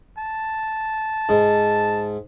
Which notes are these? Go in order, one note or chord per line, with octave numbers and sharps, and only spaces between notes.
A5
G#2